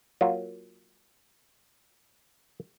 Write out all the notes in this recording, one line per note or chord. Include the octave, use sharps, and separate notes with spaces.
F#3 A#3 F4